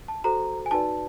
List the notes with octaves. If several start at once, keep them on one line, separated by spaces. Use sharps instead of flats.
A5
F#4 A4 C5 A#5
G#5
D#4 F#4 B4 D5 A5